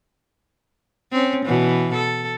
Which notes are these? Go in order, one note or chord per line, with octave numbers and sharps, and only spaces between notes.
C4 C#4
B2 E3
A4